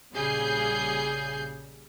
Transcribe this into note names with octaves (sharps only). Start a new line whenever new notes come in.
A#1 C#3 G3 G#4 G6 C7